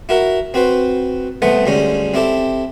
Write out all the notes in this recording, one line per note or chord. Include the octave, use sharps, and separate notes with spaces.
E4 F#4 A#4 F#5
C4 F#4 B4 C5
C2 A3 B3 C5 F#5
D2 G3 G#3 C#4
C4 E4 G4 A4